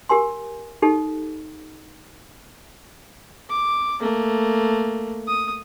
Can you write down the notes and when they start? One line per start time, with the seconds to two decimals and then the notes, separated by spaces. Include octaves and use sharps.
0.09 G4 A#4 G#5 C6
0.82 D#4 G4 A4
3.50 D6
4.01 A3 A#3
5.28 D#6